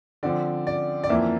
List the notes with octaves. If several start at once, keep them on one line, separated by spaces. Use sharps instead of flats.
D3 F3 C4 D5
D5
D5
F2 E3 A#3 E5